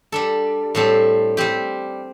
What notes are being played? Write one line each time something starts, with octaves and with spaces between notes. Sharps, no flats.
G3 D4 A4
A2 G3 C4 A4
G3 C4 G4